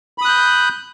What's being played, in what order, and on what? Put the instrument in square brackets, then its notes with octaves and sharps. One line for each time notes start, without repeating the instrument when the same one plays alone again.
[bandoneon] B5
D#6
F#6
G6